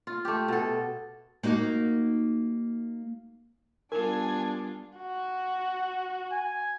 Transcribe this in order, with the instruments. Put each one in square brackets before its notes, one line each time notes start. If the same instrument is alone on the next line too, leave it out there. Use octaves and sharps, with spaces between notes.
[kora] F4
A3 G4
B2 A4
[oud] A#3 D#4 F#4
[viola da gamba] G3 B3 F4 [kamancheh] D4 [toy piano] A#4 [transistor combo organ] G#5
[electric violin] F#4
[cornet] G#5